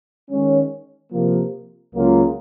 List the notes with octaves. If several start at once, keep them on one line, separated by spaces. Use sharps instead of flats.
D#3 G#3 C#4
C3 F3 A#3
C#2 C#3 F#3 A#3 F4